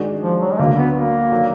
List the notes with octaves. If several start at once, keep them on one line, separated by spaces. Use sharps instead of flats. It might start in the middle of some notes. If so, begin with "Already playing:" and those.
Already playing: D#3 G#3 D4 F#4
F3
F#3
G#3
D2 D3 F#3 A#3 D4
B3
A#3
D#3 F#3 D4 F#4